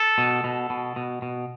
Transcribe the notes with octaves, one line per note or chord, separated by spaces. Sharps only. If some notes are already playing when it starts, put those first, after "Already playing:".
Already playing: A4
B2
B2
B2
B2
B2